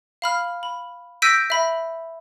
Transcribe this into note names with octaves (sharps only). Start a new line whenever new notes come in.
F5 B5 F6
B5
E6 G6 A#6 B6 D7 D#7
E5 B5